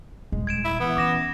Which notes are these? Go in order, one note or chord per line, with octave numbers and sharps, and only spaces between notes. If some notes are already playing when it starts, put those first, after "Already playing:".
D#1 G#3
G#6 D7 E7
E4
E3 B3
C#4 D6 A#6 E7